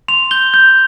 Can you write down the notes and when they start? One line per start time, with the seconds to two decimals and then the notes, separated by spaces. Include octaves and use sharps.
0.08 C6 F7
0.31 G6 G7
0.54 G6